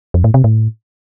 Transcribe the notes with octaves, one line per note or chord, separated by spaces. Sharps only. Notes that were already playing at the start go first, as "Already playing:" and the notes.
F2
A2
C3
A2